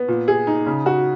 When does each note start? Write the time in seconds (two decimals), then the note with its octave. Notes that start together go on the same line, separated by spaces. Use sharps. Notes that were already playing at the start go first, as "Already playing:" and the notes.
Already playing: B3
0.08 A#2
0.28 G#4
0.47 D#4
0.66 C#3
0.86 F#4